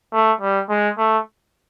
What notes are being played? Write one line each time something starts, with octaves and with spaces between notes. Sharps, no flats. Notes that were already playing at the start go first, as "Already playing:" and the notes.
A3
G3
G#3
A3